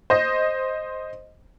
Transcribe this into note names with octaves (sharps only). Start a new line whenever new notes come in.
C5 D#5